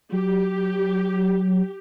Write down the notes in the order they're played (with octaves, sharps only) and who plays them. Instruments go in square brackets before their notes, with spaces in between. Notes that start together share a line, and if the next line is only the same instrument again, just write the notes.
[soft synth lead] F#3 [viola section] G4